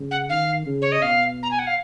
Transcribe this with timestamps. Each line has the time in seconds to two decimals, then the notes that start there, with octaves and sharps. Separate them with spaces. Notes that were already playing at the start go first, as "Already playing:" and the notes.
Already playing: C#3
0.11 F#5
0.29 D#3 F5
0.66 C#3
0.82 C#5
0.92 D#5
1.02 B2 F5
1.43 A#5
1.51 G#5
1.59 F#5
1.67 F5